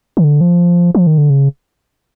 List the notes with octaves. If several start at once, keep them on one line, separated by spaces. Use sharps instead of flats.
D#3
D3
F3
F3
D#3
D3
C#3